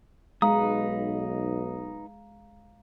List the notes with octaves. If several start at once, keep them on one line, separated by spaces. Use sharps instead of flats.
B1 G#3 D#4 B4 F5 A#5 D#6